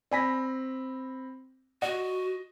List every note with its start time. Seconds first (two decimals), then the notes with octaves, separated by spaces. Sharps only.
0.11 C4 D5 G#5 B5 A#6 B6
1.82 F#4 D5 D#5 F#5